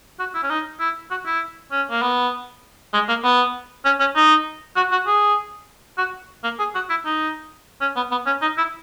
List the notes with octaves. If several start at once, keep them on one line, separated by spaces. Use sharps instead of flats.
F#4
E4
C#4
D#4
E4
F#4
E4
C#4
A#3
B3
G#3
A#3
B3
C#4
C#4
D#4
F#4
F#4
G#4
F#4
A#3
G#4
F#4
E4
D#4
C#4
B3
B3
C#4
D#4
E4